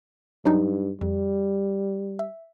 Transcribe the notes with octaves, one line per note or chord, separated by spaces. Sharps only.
G2 F#3 D4 D#4
F2 G3
E5